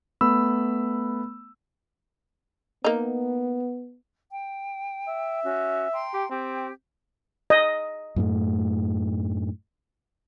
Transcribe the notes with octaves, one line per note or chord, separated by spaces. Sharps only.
A3 B3 B5 E6
A#3 B3 D#4
G5
E5
C#4 F#4
G5 A#5 C6
G4
C4 G4
D#5
F#2 A2 A3